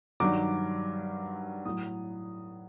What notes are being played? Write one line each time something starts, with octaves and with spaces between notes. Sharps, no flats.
G2 D#3 F#3 D6
A2 F#3 D#6